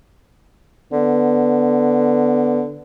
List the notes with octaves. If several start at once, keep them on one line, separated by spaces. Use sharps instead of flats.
D3 B3